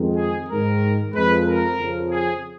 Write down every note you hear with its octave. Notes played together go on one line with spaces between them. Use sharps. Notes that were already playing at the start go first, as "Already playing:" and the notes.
Already playing: F2 D#3 G#3
G#4
G#2 D#3 G#3 A#4
F2 F3 G#3 B4
A#4
F2 C#3 F3
G#4